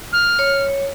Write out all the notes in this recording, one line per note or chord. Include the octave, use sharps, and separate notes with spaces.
F6
C#5